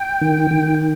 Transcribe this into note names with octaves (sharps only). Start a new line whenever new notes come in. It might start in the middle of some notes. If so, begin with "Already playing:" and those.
Already playing: G5
D#3
D#3